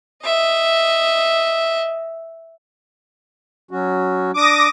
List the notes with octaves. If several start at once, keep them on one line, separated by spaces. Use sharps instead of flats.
D#5 E5
F#3 C#4 F#4
D4 D6 D#6 A#6